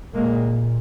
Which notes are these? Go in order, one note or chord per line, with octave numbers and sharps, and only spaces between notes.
A#2 G#3 A#3